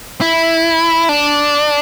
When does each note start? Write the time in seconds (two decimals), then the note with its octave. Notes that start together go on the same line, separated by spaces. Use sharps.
0.21 E4
1.09 D4